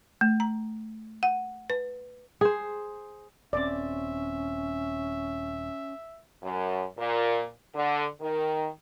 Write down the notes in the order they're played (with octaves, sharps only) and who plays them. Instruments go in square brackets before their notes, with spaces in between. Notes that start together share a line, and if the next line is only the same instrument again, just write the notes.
[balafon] A3
A#5
F#5
B4
[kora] G#4 C5
[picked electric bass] D#1 C4 [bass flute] C#4 [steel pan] D5 [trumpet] E5
[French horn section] F#2
A#2
D3
D#3